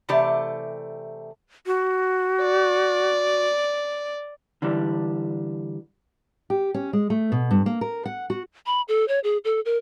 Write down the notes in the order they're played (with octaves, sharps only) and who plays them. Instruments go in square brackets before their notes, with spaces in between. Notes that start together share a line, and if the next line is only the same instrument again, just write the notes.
[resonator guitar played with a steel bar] C3 E3 A3 G4 D5
[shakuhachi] F#4
[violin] D5
[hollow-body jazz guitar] D3 E3 G3 D4
[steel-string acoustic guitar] G4
C#4
G#3
A3
B2
G2
A#3
A#4
F#5
F#4
[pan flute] B5
A4
C#5
G#4
A4
A#4